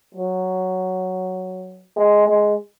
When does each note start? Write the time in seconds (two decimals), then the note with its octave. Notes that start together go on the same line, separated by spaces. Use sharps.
0.15 F#3
1.97 G#3
2.27 G#3